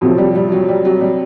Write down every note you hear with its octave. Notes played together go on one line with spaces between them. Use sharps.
F2 C3 F3 F#3
G3
G3
F#3
G3
F#3
G3